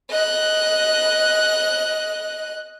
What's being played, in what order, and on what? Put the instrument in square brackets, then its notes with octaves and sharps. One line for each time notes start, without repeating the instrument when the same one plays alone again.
[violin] D#5 F#6